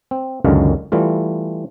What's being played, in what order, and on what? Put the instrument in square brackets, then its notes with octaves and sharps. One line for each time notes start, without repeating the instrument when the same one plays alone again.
[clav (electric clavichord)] C4
C#2 F#2 D3 D#3 G#3 F5
E3 G3 A3 F4